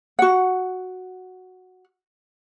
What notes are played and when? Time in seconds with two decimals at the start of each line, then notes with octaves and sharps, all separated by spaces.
0.19 F#4 F#5